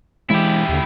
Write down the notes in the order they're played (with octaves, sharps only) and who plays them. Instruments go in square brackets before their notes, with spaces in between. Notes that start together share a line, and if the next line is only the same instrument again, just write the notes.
[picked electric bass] E3 G#3 [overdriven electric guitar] E4 G4
[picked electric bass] D#2 D3